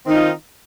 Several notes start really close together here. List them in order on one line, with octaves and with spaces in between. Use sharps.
C4 D#3 D#4 F4